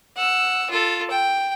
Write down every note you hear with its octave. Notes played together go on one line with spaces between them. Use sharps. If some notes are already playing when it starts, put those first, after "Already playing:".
F#5 E6
F4 A4
G5